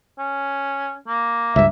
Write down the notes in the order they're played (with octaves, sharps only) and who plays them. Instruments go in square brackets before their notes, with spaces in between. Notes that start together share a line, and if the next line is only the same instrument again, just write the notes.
[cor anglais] C#4
A#3
[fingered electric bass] C#2 G2 [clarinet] E5